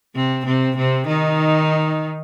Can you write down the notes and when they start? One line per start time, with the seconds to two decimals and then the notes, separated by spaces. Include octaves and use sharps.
0.15 C3 C4
0.46 C3 C4
0.77 C3 C4
1.07 D#3 D#4